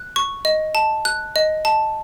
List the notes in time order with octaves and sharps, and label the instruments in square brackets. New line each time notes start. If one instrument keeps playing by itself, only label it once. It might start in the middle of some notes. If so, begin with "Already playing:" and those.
Already playing: [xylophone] F#6
C#6
D#5
A5
F#6
D#5
A5